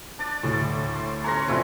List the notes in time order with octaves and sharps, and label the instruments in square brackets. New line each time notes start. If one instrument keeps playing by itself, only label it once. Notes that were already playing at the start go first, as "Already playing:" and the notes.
[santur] D4 D5
[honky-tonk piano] D2 A2
[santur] C6
[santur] C#4 B4 C#5 [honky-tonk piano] A#5 C6 A#6
[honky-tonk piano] F1 A#1 [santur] A3 C4 E4